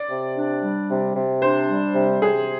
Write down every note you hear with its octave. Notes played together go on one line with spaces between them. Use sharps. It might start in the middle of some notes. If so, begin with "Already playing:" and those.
Already playing: D5
C3
D4
G3
C3
C3
D4 C5
G3
C3
C3 G#4